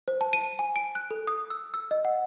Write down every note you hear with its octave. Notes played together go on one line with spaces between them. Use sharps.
C5
A5
D#7
G#5
D7
F#6
A4
D#6
E6
E6
D#5
F#5